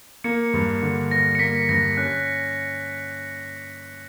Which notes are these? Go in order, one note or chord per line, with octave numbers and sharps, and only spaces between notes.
A#3 C#7
G2
D3
G2 A#6
C#7
A#3 B6
G2 A#6
C#4 F#6